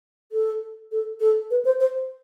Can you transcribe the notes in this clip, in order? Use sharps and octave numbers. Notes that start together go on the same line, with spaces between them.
A4
A4
A4
B4
C5
C5